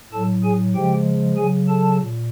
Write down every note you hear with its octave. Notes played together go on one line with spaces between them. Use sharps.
A2 F#3 A4 A5
G#4 G#5
C#3 F3 G#3 G4 G5
C#3 F#3 G#4 G#5
A4 A5
A#2